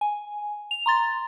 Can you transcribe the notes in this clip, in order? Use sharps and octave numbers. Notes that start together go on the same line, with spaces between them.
G#5
F7
A#5 C6 A6